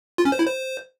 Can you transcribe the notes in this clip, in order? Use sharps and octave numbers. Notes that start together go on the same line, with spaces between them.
F4
C#4
C5
E4
C5